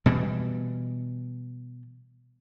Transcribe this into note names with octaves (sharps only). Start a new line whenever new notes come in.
B2 E3 G3